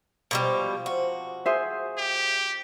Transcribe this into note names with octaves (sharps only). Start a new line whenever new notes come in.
B2 D#3 F3 G3 G#3
C3 F#4
G#4 C5 E5
G4